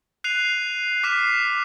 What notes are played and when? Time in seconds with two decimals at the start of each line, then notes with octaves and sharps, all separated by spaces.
0.24 F#6 C7 D#7 F7
1.04 D6 F6 B6 C7 E7